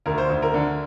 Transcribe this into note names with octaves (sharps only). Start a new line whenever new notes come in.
D2 A#4
C5
D2
A#4
D3